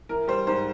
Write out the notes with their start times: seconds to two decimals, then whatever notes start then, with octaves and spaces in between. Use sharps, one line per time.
0.09 E3 A#4
0.28 G3 C5
0.47 G#2 C5